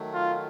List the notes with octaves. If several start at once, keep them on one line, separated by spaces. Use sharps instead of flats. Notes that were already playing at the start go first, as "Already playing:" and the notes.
Already playing: D#3 F#3 A3
F4